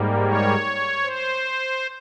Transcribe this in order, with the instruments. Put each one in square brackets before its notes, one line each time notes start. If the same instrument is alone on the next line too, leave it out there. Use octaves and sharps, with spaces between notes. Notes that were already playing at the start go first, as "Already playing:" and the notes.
Already playing: [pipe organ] G#2 G3 A#3
C#5
C5